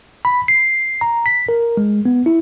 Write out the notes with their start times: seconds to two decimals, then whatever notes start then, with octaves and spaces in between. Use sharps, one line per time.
0.25 B5
0.48 C7
1.01 A#5
1.26 B6
1.49 A#4
1.77 G#3
2.06 B3
2.26 E4